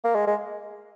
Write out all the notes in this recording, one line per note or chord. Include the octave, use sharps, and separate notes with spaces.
A#3
G#3
G#3